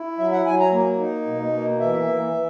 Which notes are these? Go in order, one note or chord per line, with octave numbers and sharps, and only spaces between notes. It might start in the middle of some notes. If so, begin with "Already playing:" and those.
Already playing: E4
F#3 E5
F#5
F#3 G#5
A#5
A#3
D#4
B2
A#3
E3 E5
E3
E3